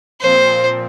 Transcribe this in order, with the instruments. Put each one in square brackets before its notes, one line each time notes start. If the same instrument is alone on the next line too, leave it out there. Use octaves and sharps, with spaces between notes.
[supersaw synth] A#2 F3 C4 [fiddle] C5